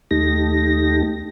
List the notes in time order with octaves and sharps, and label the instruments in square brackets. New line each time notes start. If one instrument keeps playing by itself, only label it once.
[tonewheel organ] D#2 A3 D#4 G4 A#6